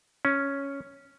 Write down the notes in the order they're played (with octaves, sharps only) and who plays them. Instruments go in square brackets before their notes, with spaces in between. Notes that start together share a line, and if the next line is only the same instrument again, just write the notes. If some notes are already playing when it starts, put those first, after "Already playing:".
[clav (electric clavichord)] C#4